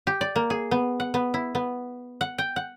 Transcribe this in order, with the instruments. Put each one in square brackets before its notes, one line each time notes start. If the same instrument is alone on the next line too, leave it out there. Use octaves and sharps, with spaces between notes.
[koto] G4
D5
A#3
G#4
B3
F#5
B3
E4
B3
F#5
G5
F#5